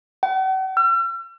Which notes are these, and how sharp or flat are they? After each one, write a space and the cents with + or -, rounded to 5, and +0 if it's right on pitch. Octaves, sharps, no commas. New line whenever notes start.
F#5 +45
E6 +45